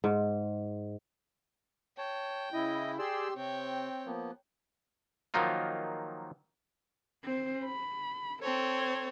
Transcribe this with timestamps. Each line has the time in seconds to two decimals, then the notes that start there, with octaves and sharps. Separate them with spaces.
0.04 G#2
1.98 C#5 G5 A5
2.53 C#3 E4 D#5
2.99 G4 G#4 D5 C6 E6
3.37 C3 C4 C#5 G5
4.06 F3 A#3 B3
5.34 D#3 F3 F#3 A#3 D#4 F4
7.24 C4 C5
7.65 B5
8.43 C4 A4 C#5